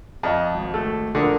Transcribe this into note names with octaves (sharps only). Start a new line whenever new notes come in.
F2 D#5 A5
G#1
A3
A#1 D3 A#4 D#6